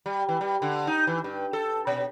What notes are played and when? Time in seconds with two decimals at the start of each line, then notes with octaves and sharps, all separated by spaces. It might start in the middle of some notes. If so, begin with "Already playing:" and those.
0.06 G3
0.29 E3
0.41 G3
0.62 D3
0.87 D#4
1.07 E3
1.24 G2
1.53 A4
1.87 B2